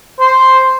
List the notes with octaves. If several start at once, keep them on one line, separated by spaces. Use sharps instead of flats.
C5